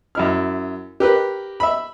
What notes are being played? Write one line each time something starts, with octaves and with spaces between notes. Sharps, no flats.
F#2 E4 F6
G4 A#4 B4
E5 B5